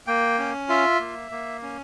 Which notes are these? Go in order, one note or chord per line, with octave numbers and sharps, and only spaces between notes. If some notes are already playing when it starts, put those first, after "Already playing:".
A#3 G5
C#4
F4 E5
A#3
A#3
C#4